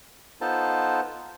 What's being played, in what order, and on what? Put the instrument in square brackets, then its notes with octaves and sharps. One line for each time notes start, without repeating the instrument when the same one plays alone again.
[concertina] B3 D#4 F4 A4 C5 A5